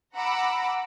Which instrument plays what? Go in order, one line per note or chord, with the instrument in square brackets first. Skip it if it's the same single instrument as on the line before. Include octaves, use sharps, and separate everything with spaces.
[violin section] F#5 A#5 B5 D6 E6